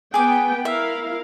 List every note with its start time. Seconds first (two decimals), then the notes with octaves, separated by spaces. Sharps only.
0.14 B3 G#4 G5 D6
0.65 E4 A#4 E5 F5